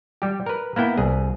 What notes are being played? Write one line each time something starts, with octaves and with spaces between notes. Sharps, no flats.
G3 G4
A#4 B4
A#3 B3 E4 G5
C2 G#4